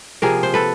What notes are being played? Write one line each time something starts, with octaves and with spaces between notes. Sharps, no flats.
C3 F3 A#3 G#4 A#4
C5
A4 B4